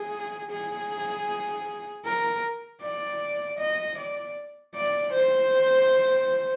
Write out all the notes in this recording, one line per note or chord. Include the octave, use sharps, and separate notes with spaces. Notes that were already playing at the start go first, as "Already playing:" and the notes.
Already playing: G#4
G#4
A#4
D5
D#5
D5
D5
C5